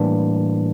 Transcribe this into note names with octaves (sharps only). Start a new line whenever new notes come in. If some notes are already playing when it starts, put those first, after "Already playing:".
Already playing: A2 E3 G3 A#3 D4